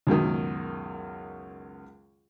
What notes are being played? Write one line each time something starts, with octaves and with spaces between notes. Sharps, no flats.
C#2 F#2 B2 D#3